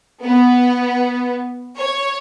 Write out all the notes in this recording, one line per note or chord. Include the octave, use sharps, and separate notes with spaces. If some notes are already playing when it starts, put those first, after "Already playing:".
B3
C#5